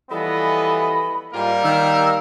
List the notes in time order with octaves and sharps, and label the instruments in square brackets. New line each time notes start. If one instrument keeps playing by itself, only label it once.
[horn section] E3 B3 D#5 [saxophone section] F3 G3 A4 [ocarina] B5
[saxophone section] G#2 F4 [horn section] G3 A#3 A#4
[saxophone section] D#3 [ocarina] E6